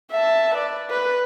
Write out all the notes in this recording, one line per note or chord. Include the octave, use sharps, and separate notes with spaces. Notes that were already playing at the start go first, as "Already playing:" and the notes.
E5 A5
B4 D5
B4